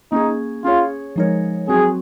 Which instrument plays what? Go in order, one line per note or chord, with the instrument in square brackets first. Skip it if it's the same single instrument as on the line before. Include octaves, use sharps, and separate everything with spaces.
[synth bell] A#3 C#4 G#4 [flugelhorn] D#4
[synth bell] C#4 G#4 C#5 [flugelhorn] F4
[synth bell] F3 G#3 D#4 A#4 C#5
[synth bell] F#3 C4 F#4 [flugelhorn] G#4